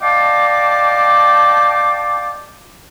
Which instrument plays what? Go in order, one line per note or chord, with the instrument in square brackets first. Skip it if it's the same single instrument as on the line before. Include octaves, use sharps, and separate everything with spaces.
[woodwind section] D5 D#5 F5 G5 A5 D6